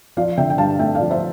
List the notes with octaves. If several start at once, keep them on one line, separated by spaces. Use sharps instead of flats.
F3 D5 F5
D3 E5 G5
G5
G2 F5 A5
A3 E5 G5
D5 F5
F3
C5 E5